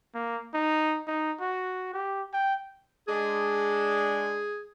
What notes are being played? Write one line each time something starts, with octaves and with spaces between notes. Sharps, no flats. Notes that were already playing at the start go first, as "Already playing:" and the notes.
A#3
D#4
D#4
F#4
G4
G5
G#3 D4 G#4